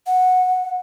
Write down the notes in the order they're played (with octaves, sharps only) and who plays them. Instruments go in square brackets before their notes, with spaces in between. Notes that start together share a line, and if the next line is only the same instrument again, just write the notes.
[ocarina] F#5